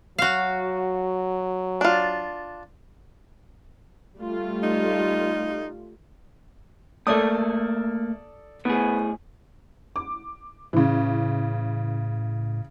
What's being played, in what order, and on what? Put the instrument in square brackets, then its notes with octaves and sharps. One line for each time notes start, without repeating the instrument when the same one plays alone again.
[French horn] F#3 [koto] F#4 F5
[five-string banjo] D4 F4
[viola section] G3 A3 F4
[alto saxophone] D#4
[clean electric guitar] A3 A#3 E5 [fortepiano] A4 D5 D#6
[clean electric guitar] A2 G#4 [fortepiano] B3
[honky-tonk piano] D6
[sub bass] A2 [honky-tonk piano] C#3 E3